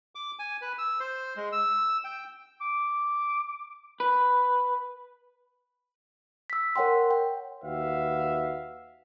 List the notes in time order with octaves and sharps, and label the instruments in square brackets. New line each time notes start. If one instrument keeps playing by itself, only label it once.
[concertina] D6
G#5
B4
E6
C5
G#3
E6
G5
[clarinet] D6
[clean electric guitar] B4
[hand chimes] E6 B6
A#4 C#5 F#5 G5 C6
G5
[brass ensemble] D#2 F#4 B4 E5 F5